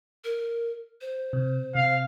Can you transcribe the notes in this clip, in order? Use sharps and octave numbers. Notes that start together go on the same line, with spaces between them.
A#4
C5
C3
C3 F5